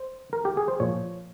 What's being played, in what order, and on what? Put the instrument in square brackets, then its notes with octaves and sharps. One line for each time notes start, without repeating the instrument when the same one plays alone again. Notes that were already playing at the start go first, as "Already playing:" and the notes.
Already playing: [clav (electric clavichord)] C5
A#4
G4
G#4
C5
A#2 F3 C#5